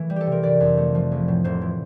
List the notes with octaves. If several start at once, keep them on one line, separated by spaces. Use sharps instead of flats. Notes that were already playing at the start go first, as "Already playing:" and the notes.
Already playing: E3 A3
G3
G4 A4
C3
A#4
G1 D5
F2
A3
F3
A#1
A2
F1 C5
E3